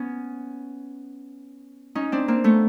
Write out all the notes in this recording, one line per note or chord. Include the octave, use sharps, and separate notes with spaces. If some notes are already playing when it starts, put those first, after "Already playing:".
Already playing: B3 C#4
C#4 D#4
C4 D4
A#3 C4
A3 B3